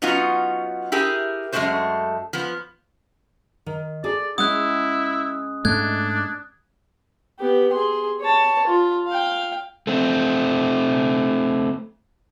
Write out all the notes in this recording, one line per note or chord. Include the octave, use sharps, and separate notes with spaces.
F#3 B3 C#4 D#4 F4 F#4
E4 G4 G#4 A#4
F#2 G#3 A3 B3 F#4 C5
F3 B3
D#3
G#4 A4 D5
G#3 C#4 E4 F#5 D#6 F#6
G#2 A3 D4 F#6 G#6
B3 G4
G#4 C6
C#5 A5
F4
F5 G5
A3 C4